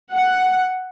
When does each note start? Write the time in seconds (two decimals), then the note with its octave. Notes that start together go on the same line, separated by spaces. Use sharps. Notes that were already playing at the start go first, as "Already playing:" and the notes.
0.13 F#5